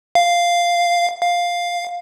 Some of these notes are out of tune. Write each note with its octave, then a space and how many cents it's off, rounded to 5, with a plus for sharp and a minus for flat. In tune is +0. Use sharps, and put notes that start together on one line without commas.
F5 -5
F5 +5